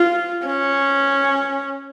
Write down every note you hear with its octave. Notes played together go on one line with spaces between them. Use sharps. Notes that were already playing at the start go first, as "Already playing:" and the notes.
Already playing: F4
C#4